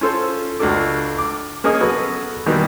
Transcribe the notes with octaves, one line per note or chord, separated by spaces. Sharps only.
C#4 F4 A4 C5
C#2 D4 F#4 A4 D6
D6
A#3 C#4 G#4 A#4 D#5 D#6
F#3 B3 F#4 A4 B4
B2 D#3 E3 G3 A#3 B3